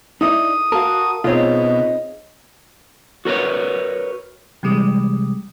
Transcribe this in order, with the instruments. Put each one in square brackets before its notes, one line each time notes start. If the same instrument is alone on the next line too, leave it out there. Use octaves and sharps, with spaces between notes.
[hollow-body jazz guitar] D#4 E4 D5 [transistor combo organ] D#6
[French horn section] F#4 [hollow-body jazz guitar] A#4 [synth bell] F5 A5
[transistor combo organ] B2 [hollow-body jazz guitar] C4 D#4 F4 [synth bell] G#4 C#5 [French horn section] D#5
[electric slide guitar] F#4 A#4 B4 C#5
[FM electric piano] C3 E3 G3 G#3